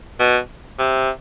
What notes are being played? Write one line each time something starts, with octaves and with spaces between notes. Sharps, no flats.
B2
C3